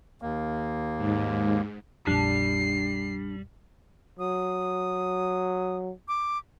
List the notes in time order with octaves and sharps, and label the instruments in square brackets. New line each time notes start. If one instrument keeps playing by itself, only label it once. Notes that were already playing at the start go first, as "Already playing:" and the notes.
[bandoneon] D#2 A#3
[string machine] G#2
[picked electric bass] A#1 F2 [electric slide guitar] G3 [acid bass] D4 [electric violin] C7
[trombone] F#3 [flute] D#6
[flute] D6